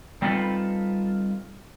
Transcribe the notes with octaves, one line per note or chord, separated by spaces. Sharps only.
G3 C4 D#4 F4 A4 B4